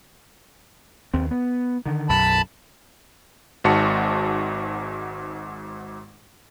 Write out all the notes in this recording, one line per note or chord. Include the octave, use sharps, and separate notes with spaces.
D#2 C4
B3
D3 D#3
B1 F#2 A5 B5
G#1 G#2 F#4 A5 C#7